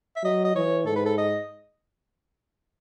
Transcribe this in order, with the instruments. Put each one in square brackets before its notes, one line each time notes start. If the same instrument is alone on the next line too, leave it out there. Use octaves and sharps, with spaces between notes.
[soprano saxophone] E5
[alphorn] F#3 [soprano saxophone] D#5
[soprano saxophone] D#5
[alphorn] E3 [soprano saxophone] C#5
[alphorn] G#2 [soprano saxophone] A4
[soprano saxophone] B4
A4
D#5